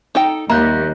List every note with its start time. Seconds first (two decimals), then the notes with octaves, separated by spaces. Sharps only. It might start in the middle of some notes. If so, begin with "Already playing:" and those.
0.15 D#4 A4 G5
0.50 D#2 G3 A#3 E5 A#5 F#6 G6